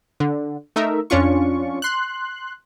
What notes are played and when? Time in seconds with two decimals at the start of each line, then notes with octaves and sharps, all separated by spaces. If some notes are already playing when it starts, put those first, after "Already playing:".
0.20 D3
0.76 A3 D#4 A#4 E5
1.10 F2 C#4 D4 F4 C#6
1.82 C6 F#6